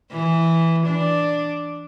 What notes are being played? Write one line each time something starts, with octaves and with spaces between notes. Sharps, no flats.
E3
D4